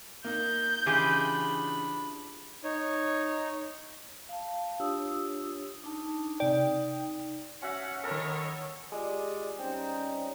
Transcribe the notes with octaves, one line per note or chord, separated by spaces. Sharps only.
A#3 D#4 G6
C#3 E3 D4 D#4 F4 G4 G#4 B5
D#4 C#5
F5 A5
D4 F4 G4 C#5 D#6 E6
D4 D#4 A5
C3 D#4 D5 G5
C#4 F#4 E5 F#5
D#3 B3 A4 A#4 C#5
G#3 F4 G4 D5
G3 C4 C#4 D#4